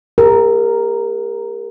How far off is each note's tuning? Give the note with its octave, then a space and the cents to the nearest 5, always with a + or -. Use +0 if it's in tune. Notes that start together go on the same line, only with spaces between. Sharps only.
G4 +45 A#4 +0